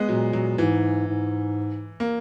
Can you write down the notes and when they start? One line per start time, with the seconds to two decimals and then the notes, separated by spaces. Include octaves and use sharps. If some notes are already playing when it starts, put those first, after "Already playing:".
Already playing: G#3 B3
0.09 A#2 F#3
0.33 A#2 F#3
0.58 G#2 E3
1.08 G#2
2.00 A#3